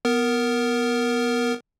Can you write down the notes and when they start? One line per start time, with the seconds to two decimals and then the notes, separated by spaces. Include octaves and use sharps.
0.05 B3 A#4